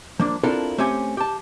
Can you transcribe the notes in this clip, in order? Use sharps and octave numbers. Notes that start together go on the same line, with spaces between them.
F3 A#3 D4
C4 D4 E4 F4 A4 A#4
A3 C4 C#4 G4 G#5
G4 A5